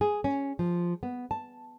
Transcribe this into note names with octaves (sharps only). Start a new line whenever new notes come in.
G#4
C#4
F3
B3
A5